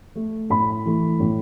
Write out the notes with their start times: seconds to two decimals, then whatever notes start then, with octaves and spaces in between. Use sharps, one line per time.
0.15 A3
0.50 A2 B5
0.86 E3 A3
1.20 A2